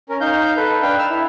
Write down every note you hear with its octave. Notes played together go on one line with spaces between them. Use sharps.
C#4 A#4
D#4 F5 G6
A4 B4
D4 B4 F5 G5
E6 F6
E4